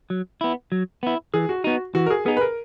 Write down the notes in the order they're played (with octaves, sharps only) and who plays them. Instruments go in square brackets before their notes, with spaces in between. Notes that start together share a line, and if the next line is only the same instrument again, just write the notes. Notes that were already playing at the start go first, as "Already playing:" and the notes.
[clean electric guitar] F#3
B3 E4
F#3
B3 E4
[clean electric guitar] E3 [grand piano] G#4
[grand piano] F#4
[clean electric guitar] B3 D#4 [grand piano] F#4
[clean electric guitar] E3 [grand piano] F#4
[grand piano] A#4
G#4
[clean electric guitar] B3 D#4 [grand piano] G#4
[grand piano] B4
A#4